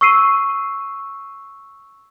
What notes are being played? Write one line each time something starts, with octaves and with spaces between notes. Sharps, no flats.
C#6 E6 C7 D#7